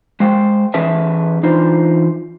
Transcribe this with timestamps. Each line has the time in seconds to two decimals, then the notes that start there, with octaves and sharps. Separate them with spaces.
0.20 G#3 C5 F5 G5
0.74 E3 C#4 G#4 B4 E5 A5
1.43 E3 D4 D#4 F4 C5